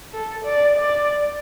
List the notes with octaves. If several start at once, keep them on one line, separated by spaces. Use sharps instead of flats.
A4
D5
D5